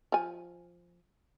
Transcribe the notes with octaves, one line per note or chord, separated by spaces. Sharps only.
F3 G#5